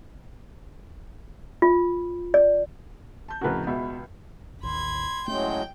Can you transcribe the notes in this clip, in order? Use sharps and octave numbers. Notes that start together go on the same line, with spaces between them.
F4
D5
A5 G6
F2 A2 C#3 F#4 A#4 B4
C#2 B2 E5
A1 D#2 B5 C6 G#6
A2 F#3 G#3 A3 C#4 G5 G6